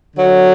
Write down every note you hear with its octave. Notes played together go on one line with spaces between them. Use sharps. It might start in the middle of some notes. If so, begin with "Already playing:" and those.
D3 F#3